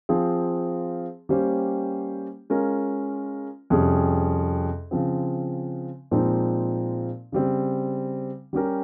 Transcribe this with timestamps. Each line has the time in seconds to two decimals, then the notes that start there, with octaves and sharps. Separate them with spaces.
0.09 F3 C4 F4 G#4
1.29 G3 A#3 C#4 G4 C5
2.50 G#3 C#4 F4 A#4
3.70 F2 C3 G3 C#4 G#4
4.91 C#3 F3 C4
6.11 A#2 F3 G#3 C4 D#4
7.32 C#3 G3 C4
8.53 G3 C#4 G4 A#4